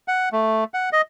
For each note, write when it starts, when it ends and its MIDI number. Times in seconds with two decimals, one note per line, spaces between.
0.08 0.29 78
0.32 0.64 57
0.74 0.89 78
0.93 1.01 75